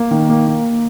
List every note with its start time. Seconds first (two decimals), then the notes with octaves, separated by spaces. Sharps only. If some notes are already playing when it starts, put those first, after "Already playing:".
Already playing: A#3
0.11 D#3
0.29 A#3
0.47 A#3